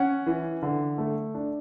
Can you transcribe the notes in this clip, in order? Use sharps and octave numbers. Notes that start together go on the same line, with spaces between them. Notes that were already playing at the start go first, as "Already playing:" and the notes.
Already playing: C#4 F#5
E3
D3
A3
D4